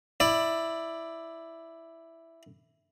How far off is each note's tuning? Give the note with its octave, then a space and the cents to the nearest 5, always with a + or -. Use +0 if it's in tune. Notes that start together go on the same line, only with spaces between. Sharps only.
E4 +0 D5 +10